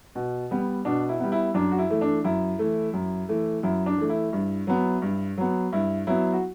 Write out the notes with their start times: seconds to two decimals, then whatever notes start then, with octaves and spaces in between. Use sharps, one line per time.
0.15 B2
0.51 G3 B3
0.85 B2 D4
1.09 E4
1.20 G3 B3
1.32 E4
1.54 F#2 D4
1.72 F#4
1.78 E4
1.90 E3 A3
2.01 D4
2.24 F#2 E4
2.59 E3 A3
2.94 F#2
3.29 E3 A3
3.63 F#2 E4
3.86 D4
3.98 E3 A3
4.09 E4
4.33 G2
4.67 F#3 B3
5.02 G2
5.38 F#3 B3
5.73 G2 E4
6.07 F#3 B3 E4
6.33 F#4